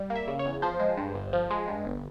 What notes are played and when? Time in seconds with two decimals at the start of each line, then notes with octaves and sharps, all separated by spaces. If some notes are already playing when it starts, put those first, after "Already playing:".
Already playing: G3
0.10 A#3
0.16 E5
0.28 C#3
0.39 C#5
0.46 E2
0.62 F3 C5
0.80 G#3
0.97 G2
1.14 G1
1.33 F3
1.50 G#3
1.68 G2
1.85 G1